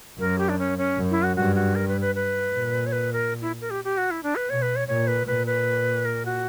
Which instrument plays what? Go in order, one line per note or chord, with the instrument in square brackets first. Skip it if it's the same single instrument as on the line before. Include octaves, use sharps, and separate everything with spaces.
[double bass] F#2 [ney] A#4
[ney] G4
D4
C#4
C#4
[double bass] F#2
[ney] E4
F#4
[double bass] G2 [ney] F#4
[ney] F#4
A#4
B4
B4
B4
[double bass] A#2
[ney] C#5
B4
A#4
E4
A#4
G4
G4
F#4
E4
D4
B4
[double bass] B2 [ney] C#5
[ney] B4
C#5
[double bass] A#2 [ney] C#5
[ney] B4
[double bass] A#2 [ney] B4
[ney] B4
A#4
F#4